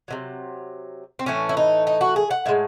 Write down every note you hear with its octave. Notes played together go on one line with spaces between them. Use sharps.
C3 D#3 F#3
C4
A2 E3 A3 C#4
E4
D#4
D#4
F#4
G#4
F#5
A2 G#3 E5